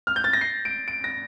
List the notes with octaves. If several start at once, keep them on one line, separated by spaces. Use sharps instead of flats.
F6
G6
A6
A#6
C7
D7
D7
A#6